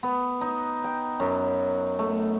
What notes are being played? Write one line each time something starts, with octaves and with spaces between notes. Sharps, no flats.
B3
D#4
G5
F#2
A3